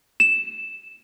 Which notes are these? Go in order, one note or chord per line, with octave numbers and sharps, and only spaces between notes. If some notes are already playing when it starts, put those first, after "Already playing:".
E7